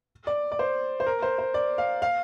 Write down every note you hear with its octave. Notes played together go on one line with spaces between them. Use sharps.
D5
D5
C5
C5
A#4
C5
C5
D5
F5
F5